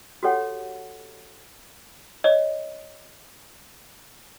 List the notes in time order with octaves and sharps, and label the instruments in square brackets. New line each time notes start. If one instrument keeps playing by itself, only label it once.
[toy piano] F#4 G4 A4 C#5 F#5
[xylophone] C#5 D#5